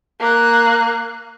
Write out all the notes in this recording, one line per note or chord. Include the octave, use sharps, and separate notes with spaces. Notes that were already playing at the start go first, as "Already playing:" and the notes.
A#3 F#6